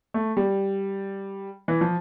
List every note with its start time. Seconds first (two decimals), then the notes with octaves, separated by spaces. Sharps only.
0.14 A3
0.37 G3
1.68 E3
1.81 F3